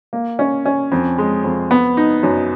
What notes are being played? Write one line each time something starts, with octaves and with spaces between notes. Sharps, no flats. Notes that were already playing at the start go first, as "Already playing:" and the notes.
A#3
C#4
C#4
F2
G#3
F2
B3
D#4
F#2